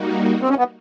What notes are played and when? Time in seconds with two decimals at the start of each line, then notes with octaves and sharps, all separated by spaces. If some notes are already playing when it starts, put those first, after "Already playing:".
Already playing: G3 A#3 D#4 F#4
0.42 C4
0.50 C#4
0.59 B3